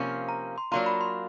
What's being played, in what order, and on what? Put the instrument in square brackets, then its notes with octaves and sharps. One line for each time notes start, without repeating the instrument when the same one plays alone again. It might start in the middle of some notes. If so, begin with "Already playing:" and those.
Already playing: [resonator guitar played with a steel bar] C3 F3 A#3 C#4
[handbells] A#5
C6
[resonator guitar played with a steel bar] F#3 A#3 D4 F4 [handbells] A#5
[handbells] B5
C6